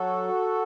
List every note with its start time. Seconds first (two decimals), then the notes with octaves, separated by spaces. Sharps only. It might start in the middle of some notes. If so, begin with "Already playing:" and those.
Already playing: F#3 F#4 A4